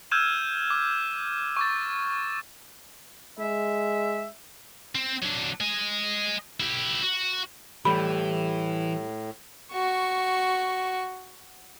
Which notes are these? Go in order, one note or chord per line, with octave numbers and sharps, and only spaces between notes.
E6 F6 G6 G#6 D#7 E7
D6
C#6 D6 A6
G#3 E5
C4
F#3 D4
D#5 G#5
E4 G4
F#4
A2 E3 G3 A3 G4 B5
F#4 C#6